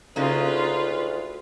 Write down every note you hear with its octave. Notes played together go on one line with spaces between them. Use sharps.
D2 C#3 A#3 D#4 F4 B4